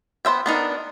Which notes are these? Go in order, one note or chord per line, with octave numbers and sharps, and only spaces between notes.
B3 C5 E5 G5
B3 D4 D#4 A#4